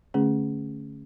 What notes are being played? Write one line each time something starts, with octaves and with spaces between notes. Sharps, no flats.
D3 A3 C#4 G#4